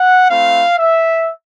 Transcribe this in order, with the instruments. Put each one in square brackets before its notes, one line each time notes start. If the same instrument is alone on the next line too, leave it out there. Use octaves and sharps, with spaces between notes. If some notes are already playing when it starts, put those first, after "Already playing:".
Already playing: [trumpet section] F#5
A3 C4 E4 F5
E5